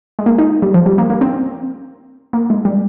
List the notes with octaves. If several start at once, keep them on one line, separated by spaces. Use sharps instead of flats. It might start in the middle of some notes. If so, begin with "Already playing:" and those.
G#3
A#3
D#4
G3
F3
G3
A#3
A#3
C4
A#3
G#3
G3